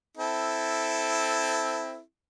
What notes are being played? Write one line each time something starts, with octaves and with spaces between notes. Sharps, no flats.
C4 E4 A4